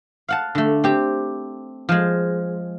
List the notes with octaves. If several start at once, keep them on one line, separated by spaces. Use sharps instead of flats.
F5 F#5 A5
D3 A3
C4 G4
F3 G#3